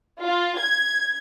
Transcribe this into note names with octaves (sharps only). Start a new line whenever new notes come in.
F4
G#6